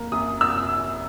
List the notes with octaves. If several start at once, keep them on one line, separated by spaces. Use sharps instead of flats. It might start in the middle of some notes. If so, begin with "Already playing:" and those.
Already playing: A#3
F#2 D#6
E6